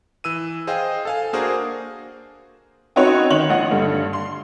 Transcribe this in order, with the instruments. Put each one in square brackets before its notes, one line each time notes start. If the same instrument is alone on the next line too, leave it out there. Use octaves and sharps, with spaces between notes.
[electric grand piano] E3 E6 D#7
G#4 C5 D#5 F5 G5
A4 F5 G#5
A#3 D4 F#4 G#4 A#4 C5
[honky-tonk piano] C4 C#4 D#4 F#4 B4 C#5
D#3 C#5 F#7
A#1 D#5 F#5
G2 D3
C6